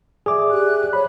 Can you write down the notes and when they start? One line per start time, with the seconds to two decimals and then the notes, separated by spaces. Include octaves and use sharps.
0.26 G#4 D5 E5 D6
0.50 G4 F#6
0.93 C5 C#5 B5